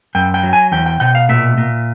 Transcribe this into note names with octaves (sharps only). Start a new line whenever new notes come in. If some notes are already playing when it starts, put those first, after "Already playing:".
F#2 G5
G5
F#3
G#5
E2 G5
G5
B2 G5
F5
A#2 E5
A#2